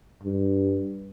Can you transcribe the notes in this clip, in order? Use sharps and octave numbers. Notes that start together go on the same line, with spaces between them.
G2